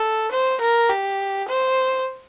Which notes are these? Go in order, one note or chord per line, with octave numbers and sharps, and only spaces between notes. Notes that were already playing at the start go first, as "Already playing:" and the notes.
Already playing: A4
C5
A#4
G4
C5